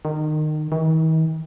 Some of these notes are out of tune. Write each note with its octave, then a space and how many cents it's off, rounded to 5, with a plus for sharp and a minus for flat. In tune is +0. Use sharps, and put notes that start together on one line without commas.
D#3 -25
D#3 +45